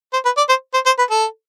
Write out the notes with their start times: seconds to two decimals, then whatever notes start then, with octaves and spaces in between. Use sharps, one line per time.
0.13 C5
0.25 B4
0.37 D5
0.49 C5
0.74 C5
0.86 C5
0.99 B4
1.10 A4